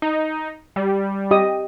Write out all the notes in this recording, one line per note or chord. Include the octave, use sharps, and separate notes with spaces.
D#4
G3
G4 D#5 D#6